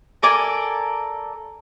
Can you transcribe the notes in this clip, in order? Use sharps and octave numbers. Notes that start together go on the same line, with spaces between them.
A4 A#4 D5 G#5